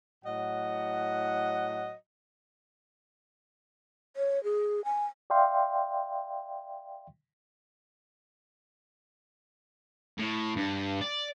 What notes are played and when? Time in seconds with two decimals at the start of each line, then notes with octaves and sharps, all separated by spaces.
0.25 A2 F#3 D#5 F#5
4.16 C#5
4.44 G#4
4.85 G#5
5.30 D5 E5 F5 G5 C6
10.18 A2
10.56 G2
11.01 D5